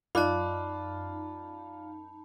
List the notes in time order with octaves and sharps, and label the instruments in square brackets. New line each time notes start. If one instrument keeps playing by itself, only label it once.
[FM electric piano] F#2 D#4 [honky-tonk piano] F4 [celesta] D5 D6 F#6 [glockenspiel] A5 B5